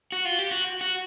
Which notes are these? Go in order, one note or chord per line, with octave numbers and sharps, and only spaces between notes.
F#4
F4
G4
F#4
F#4